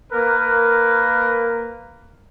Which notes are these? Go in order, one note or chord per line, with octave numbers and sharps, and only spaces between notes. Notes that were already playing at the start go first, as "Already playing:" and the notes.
A#3 A#4 B4